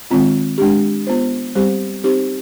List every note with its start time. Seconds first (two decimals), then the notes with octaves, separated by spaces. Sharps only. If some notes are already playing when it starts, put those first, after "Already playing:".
0.11 D#3 G#3 C4 F4
0.58 G#3 D4 G4
1.07 B3 F4 C5
1.55 G3 C4 G4 C5
2.04 C4 D#4 G4 C5